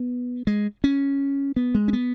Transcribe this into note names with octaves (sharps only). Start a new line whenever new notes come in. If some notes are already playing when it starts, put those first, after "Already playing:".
Already playing: B3
G#3
C#4
B3
G#3
C#4
B3